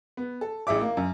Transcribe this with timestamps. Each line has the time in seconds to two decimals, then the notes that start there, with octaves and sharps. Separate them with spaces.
0.17 B3
0.41 A4
0.67 A1 G#4 E5 D6
0.81 A#3
0.97 F#2